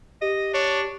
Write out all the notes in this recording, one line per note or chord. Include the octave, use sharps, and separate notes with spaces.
G4 D#5
D4 C#5